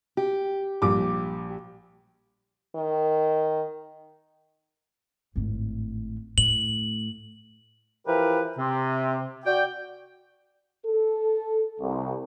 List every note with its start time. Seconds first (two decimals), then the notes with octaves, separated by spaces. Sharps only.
0.17 G4
0.82 A#1 G3 D6
2.75 D#3
5.36 G#1 A2
6.38 A2 F#7
8.07 E3 F3 G4 A#4 B4
8.58 C3
9.45 F#4 D5 G5
10.85 A4
11.80 C2